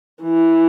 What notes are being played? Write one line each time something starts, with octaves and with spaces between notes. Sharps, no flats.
E3